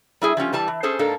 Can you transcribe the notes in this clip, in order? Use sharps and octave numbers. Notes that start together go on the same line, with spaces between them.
G3 E4 G#4
F3 G3 C#4 F4
E3 G3 A5
E3
C#4 G#4 A4 C5
G#2 A#3 D4 A4